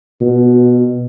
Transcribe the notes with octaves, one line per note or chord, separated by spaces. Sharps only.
B2